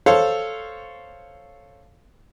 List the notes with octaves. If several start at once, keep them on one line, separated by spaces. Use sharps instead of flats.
A4 C5 C#5 F5